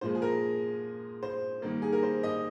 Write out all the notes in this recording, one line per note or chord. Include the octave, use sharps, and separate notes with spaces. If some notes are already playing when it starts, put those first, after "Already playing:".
A#2 F3 G#3 C5
G#4
A#4
C5
D#3 G3 A#3
G#4
A#4
C5
D#5